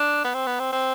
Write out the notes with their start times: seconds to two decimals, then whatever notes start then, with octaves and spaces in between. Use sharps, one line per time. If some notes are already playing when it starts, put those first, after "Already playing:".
Already playing: D4
0.24 B3
0.34 C4
0.47 B3
0.59 C4
0.73 C4